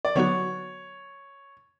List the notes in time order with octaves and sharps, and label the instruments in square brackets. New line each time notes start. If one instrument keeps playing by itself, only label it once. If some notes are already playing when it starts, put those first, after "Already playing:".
[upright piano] D5
[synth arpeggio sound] D3 F#3 B3 D#4 F#4 [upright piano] C#5